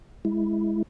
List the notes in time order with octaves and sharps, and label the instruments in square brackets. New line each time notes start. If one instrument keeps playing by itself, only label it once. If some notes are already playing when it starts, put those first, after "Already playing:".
[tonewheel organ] G#3 E4